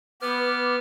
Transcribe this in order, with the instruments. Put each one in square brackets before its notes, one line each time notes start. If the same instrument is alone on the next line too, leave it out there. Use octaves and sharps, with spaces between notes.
[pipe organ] B3 F6 [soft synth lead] B4 [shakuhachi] D6